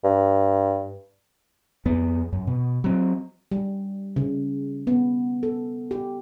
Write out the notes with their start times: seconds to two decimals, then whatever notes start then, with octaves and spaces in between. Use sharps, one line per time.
0.04 G2
1.85 F2 B3
2.33 F#2
2.47 B2
2.84 F#3 C4
3.52 G3
4.16 C#3
4.87 B3
5.43 A4
5.91 G4